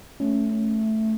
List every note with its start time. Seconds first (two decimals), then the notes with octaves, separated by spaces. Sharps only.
0.20 A3 C#4